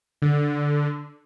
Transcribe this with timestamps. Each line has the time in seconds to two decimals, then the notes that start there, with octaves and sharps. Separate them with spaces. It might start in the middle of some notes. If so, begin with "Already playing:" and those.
0.22 D3